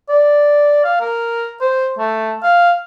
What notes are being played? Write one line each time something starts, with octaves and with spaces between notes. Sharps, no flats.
D5
F5
A#4
C5
A3
F5